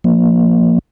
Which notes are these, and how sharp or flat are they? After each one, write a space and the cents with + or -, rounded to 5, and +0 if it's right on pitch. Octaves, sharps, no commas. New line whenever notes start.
F3 +0 A#3 +0